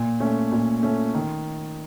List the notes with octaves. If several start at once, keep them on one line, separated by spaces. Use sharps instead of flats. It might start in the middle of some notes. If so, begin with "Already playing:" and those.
Already playing: A#2
A3 C#4
A#2
A3 C#4
D#3